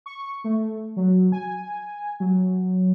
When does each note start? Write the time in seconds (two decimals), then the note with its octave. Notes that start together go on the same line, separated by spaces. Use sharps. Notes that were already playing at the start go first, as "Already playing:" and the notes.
0.06 C#6
0.44 A3
0.96 F#3
1.32 G#5
2.20 F#3